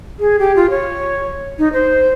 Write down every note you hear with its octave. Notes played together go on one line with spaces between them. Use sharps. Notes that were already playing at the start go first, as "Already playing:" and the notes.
G#4
G4
F4
C#5
D#4
C5